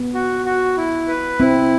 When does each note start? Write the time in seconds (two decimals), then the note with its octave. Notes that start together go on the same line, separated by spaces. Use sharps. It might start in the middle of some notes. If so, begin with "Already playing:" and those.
Already playing: B3
0.14 F#4
0.45 F#4
0.77 E4
1.08 B4
1.39 C4 E4